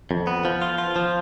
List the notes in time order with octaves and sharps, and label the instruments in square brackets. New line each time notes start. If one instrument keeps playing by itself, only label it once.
[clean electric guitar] F2
B3
F3
F4
F4
F3